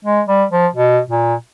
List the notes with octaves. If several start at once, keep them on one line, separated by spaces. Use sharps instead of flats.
G#3
G3
F3
B2
A#2